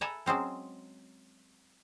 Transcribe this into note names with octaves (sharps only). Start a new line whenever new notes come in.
A4 B4 E5 G#5 A#5
F#3 G#3 C4 C#4